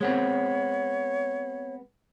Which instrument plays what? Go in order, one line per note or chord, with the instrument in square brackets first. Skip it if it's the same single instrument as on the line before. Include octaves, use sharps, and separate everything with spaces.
[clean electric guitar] G#3 B3 C4 [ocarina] C#5